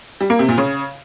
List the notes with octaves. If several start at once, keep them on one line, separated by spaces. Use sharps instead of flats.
G3
A#3
C3
A#2
C#3